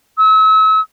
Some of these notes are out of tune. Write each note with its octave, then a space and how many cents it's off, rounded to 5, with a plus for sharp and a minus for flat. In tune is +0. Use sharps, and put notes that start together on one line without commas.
E6 -40